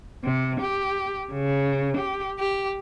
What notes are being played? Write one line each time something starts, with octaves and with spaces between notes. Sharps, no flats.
C3
G4
C#3
G4
G4